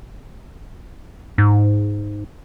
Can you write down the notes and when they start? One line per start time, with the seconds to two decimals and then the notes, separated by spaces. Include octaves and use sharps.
1.38 G#2